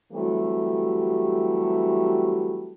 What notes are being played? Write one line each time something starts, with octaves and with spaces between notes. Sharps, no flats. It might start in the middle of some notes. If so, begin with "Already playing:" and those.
E3 F#3 G3 A3 C4 G4